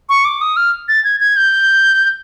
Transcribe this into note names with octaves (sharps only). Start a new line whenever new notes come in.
C#6
D6
D#6
F6
A6
G#6
G#6
G6